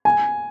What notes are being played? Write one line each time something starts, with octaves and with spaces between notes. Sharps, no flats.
G#5